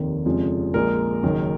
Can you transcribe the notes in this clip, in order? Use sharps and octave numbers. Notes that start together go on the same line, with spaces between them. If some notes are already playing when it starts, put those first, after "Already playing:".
Already playing: F1 D#2 D#3
F1 F2 C#3 F3 G#3
A#1 A#2 G#3 A#4
F#1 F#2 D#3